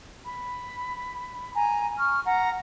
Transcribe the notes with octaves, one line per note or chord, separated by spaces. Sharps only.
B5
G#5 A#5
C#6 F6
F#5 A#5